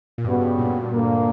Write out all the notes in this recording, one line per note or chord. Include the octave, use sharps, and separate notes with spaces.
A#2
G2 C#3 G3 B3 F#4
G2
A#2
G2
D2 D3 A#3